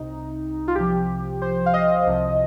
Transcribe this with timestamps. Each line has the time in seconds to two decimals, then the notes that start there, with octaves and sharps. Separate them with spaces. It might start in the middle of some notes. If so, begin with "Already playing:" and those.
Already playing: C2 C3 D#4
0.68 F4
0.75 C2 C3 F3 G4
1.42 C5
1.66 F5
1.74 D#5
2.07 C2 C3 F3